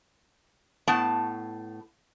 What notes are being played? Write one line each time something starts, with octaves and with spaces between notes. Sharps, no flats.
A2 B3 A5